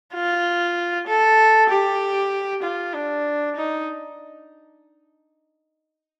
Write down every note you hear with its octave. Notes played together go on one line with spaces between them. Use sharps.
F4
A4
G4
F4
D4
D#4